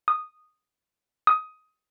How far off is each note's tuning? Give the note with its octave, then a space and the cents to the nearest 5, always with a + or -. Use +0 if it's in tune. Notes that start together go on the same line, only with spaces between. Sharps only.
D#6 -5
D#6 +15